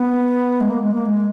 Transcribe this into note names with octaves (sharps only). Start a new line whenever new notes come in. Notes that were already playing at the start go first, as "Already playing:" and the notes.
Already playing: B3
G#3
A#3
G#3
A#3
G#3